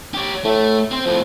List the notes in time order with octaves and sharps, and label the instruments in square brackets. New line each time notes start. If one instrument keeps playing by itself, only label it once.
[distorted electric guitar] G4 C#5
[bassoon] A2 [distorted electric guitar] A3
[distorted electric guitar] C4 C5
[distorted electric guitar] F2 A2 [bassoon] F3